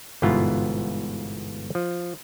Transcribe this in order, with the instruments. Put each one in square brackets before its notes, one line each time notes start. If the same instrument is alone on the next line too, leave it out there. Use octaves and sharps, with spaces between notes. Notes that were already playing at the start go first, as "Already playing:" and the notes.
[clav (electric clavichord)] G1 G#2 B2 E3 B3 F4
F3